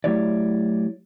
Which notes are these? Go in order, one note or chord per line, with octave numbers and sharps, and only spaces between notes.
F#3 A3 E4 G4 C#5 D5